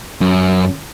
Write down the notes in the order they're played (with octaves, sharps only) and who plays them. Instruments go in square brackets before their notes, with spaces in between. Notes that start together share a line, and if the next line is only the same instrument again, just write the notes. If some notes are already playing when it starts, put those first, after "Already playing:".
[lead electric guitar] F#2